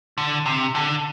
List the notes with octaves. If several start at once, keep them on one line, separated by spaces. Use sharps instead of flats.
D3
C3
D3